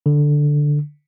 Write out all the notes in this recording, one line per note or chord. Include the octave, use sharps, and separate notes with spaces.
D3